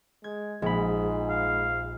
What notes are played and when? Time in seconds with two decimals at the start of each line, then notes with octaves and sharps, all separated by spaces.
0.24 G#3 G#6
0.62 A#1 G#2 G#3 B5
1.29 F5